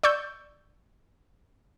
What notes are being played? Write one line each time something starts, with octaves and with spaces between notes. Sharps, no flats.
D5 C#6 E6 G6